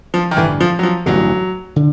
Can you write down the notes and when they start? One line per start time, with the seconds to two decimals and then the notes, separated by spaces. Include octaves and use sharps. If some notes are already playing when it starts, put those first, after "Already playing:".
0.14 F3
0.31 D#3
0.37 A1 G2 D3 E3
0.61 F3
0.79 F#3
0.83 F3
1.06 A1 G2 D3 F#3
1.76 D3